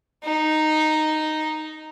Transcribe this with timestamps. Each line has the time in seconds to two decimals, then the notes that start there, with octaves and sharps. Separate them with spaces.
0.24 D#4